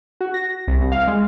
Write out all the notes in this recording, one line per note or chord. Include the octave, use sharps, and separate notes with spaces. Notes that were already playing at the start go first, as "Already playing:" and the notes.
F#4
A#6
C2
F5
G#3